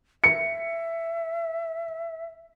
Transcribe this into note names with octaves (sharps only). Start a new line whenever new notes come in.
E5 C#7